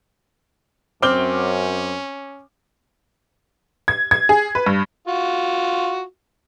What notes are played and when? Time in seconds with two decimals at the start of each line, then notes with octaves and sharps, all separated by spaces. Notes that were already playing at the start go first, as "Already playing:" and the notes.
1.02 F#2 C4 C#4 D6 F6 G7
3.88 G#6
4.11 G#6
4.29 G#4
4.55 B4
4.66 G2
5.08 F4 F#4